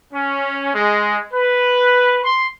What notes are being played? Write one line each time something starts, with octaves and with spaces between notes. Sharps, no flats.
C#4
G#3
B4
C6